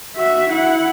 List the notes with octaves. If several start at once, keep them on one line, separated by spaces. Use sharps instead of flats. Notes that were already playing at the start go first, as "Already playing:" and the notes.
F#4 E5
E4 F#5